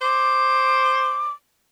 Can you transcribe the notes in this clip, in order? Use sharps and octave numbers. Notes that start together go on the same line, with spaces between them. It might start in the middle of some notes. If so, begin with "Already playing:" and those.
C5 D6